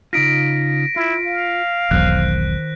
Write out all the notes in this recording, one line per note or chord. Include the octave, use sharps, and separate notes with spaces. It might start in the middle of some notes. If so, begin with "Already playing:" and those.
C#3 D#4 F4 A#6 B6 D7
E4 F4
F5
E1 B1 D#3 C5 F#6